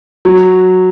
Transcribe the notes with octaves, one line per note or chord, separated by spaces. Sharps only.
F#3